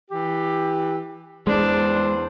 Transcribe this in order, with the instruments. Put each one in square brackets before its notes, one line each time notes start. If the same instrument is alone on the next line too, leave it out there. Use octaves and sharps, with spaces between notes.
[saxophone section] E3 G4
[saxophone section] E2 C5 [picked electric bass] G#3 [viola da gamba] D4